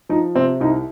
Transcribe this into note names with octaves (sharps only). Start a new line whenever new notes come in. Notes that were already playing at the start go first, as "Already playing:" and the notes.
F3 D#4
C3 C4
C2 D#4